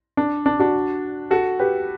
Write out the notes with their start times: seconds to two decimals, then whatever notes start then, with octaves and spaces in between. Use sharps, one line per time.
0.17 D4
0.46 D4
0.60 D4 F#4
1.31 F#4 A4
1.59 G4 B4